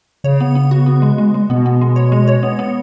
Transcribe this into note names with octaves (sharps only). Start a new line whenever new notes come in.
C#3 C#5
B3
B3
F#4
B3
G#3
G#3
G#3
B2 B3
B3
G#3
C#5
G#3
C#5
B3
B3